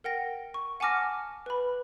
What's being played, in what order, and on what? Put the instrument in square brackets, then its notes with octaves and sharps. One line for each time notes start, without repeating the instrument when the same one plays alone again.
[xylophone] A#4 F#5 G5 A#6
C#6
F#5 G#5 A5 D6 F6 A#6
B4 B5